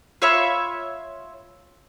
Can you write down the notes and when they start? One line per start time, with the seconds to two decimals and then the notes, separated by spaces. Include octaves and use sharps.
0.22 F4 C#5 E5 B5